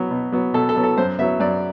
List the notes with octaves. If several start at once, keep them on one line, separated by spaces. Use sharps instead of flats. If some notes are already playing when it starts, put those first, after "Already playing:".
Already playing: B2 F#3 B3
B2
F#3 B3
B2 A4
A4
F#3 B3
A4
F#2 C5
F#3 B3 E5
F#2 D5